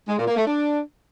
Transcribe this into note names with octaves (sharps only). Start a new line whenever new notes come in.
G#3
A#2
A#3
A3
D4